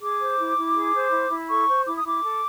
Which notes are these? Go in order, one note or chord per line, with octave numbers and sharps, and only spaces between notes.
G#4 D6
C5
E4
E4
G#4
C5
E4
E4
A4 C#6
C5
E4 D6
D#6
E4 D6
A4